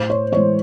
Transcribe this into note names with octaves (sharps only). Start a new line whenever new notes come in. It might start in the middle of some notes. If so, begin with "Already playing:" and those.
Already playing: A2 C5
C#5
E3 G#3 C#5